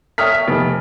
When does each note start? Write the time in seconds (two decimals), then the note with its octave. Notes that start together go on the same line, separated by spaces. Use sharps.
0.18 C#5 E5 G5 D#6 F6 B6
0.48 F1